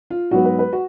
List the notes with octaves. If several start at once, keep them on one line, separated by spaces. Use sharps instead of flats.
F4
G#2 F#3 B3 F#4
B4
B4
F#4